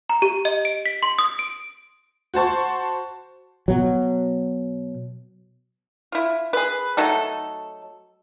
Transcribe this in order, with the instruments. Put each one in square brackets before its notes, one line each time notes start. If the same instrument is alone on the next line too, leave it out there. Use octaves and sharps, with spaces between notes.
[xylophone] A#5
G4
D#5
D7
B6
C6
D#6
D7
[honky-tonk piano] F#4 C5 A5 C#6
[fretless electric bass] B2 F#3
[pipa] E4 F4
G#4 B4
F#3 A3 D#4 A4